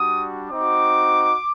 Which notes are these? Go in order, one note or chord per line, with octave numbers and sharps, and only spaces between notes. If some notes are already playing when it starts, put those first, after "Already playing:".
Already playing: G3 D4 F#4 D#6
C4 D#4 F#4 D6